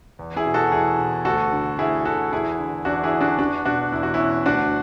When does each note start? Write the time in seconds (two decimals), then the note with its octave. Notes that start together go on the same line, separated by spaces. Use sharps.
0.19 E2
0.36 E4 G#4
0.46 B2
0.54 F#4 A4
0.72 E2 E4 G#4
0.99 B2
1.25 D2 F#4 A4
1.52 D3
1.79 D2 E4 G#4
2.05 D3 F#4 A4
2.32 E2 E4 G#4
2.58 D3
2.85 E2 D4 F#4
3.03 E4 G#4
3.13 D3
3.21 D4 F#4
3.38 E2 D4 F#4
3.65 B2 D4 F#4
3.92 E2 E4
4.03 F#4
4.14 C#4 E4
4.20 B2
4.46 D2 D4 F#4